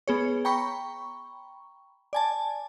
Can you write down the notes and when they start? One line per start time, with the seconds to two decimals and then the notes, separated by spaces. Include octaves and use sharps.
0.08 B3 G#4 C#5
0.45 G5 A#5 B5 C#6
2.13 D5 G#5 A5